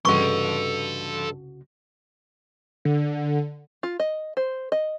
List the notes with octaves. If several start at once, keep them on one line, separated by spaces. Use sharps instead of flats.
C2 G2 C#3 F#4 A4 D#5 C6 C#6
D3
F4
D#5
C5
D#5